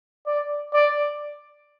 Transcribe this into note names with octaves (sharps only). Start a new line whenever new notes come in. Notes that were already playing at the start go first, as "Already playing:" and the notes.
D5
D5